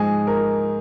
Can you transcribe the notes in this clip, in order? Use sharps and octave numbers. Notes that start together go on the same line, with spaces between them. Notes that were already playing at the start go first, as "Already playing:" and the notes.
Already playing: G#2 F3 G#3 G#4
A#4